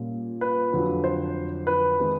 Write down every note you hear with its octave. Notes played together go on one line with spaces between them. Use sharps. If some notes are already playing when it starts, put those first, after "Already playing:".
Already playing: A#2 G3 A#3 C#4
B4
F2 D3 F#3
C5
B4
D#3 G#3 C4